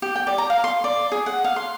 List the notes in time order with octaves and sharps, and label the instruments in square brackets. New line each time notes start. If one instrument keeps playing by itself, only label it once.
[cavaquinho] G4
G5
D5
A#5
F5
C6
D5
G#4
F#5
F5
C6